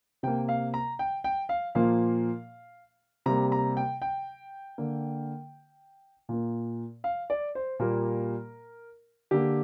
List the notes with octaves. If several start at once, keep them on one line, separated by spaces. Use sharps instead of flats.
C3 A#3 G5
F5
A#5
G5
G5
F5
A#2 F3 A#3 F5
C3 G3 A#3 A#5
A#5
G5
G5
D3 A#3
A#2 A#3
F5
D5
C5
A#2 G3 A#3 A#4
D3 A#3 G4